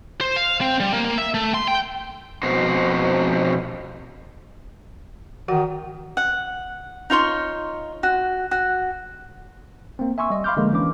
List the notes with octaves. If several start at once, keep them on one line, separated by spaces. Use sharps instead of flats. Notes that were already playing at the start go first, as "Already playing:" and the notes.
C5
F5
C4
G3
A#3
A#3
E5
A3
C6
G5
F2 B2 F#4 C5
D#3 E3 F#4 F#5
F#5
D#4 F4 C#5 C6
F#4
F#4
A#3 C4
E5 G#5 C6 C#6 E6
G3 D#5
F5 B5 C6 D6 F6 G6
D3 F3 G#3 A#3
E3 C#4 D4 D6